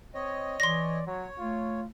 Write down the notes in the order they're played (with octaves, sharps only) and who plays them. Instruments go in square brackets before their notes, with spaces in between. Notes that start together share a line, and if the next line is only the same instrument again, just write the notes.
[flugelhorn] C4 [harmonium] C#5 D#5
[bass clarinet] E3 [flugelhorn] D5 [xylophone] C6 A#6
[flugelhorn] F#3 [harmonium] C#5
[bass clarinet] A3 [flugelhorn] F4